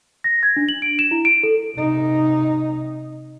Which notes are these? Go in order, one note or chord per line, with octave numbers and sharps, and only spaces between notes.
A#6
G#6
D4
F#7
D7
E7
E4
D7
A4
C3 D#4